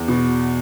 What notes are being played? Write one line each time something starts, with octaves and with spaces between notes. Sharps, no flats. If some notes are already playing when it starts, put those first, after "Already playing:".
Already playing: E2
B2